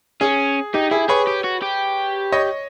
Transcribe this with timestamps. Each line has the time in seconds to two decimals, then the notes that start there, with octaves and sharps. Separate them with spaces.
0.21 C#4 G#4
0.74 D#4 G4
0.91 E4 G#4
1.09 G#4 B4 C#5
1.27 G4
1.44 F#4
1.62 G4
2.32 C#5 D#5